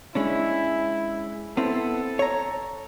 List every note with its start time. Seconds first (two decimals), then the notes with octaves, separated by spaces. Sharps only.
0.15 G#3 C#4 D4 E4
1.57 B3 C4 E4 A4
2.19 C#5 A#5